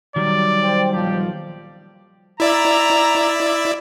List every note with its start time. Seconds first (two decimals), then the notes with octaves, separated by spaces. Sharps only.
0.16 D#3 F#3 G3 D5
0.63 C5 G5
0.93 B1 A#2 F3 G4
2.40 E4 D5 E5 A#5